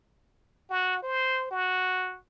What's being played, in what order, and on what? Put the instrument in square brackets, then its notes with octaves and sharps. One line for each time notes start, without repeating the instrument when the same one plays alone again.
[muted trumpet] F#4
C5
F#4